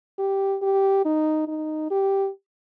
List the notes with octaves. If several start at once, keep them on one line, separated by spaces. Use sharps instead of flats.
G4
G4
D#4
D#4
G4